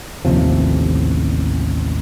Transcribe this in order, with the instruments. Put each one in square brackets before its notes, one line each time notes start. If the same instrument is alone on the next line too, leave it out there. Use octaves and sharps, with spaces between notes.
[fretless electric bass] A1 D#2 C3 F3